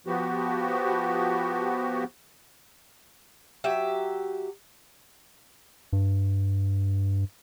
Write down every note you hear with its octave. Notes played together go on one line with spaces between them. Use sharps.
F3 B3 F#4 G4
F#3 G4 E5
G2